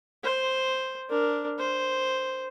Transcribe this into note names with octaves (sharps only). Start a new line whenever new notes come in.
C5
D4 A#4
C5